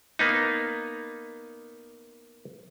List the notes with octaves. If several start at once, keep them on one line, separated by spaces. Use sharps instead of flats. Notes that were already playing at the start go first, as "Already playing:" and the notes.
A#3 B3 D#4